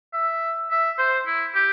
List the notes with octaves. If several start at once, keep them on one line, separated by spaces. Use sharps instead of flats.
E5
E5
C5
E4
G4